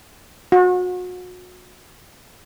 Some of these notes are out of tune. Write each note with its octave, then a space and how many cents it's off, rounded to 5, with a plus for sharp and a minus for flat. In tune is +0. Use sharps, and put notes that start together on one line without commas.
F#4 -35